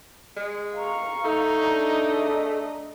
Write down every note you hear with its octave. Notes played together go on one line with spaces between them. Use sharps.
G#3
F5 A#5 C#6
A3 D#4
D4 D#5
G#4 A#5